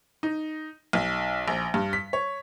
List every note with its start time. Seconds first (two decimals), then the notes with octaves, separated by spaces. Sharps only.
0.23 D#4
0.93 B1
1.48 A#1
1.74 G2
1.93 B6
2.13 C#5